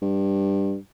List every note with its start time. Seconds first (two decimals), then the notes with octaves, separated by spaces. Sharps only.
0.02 G2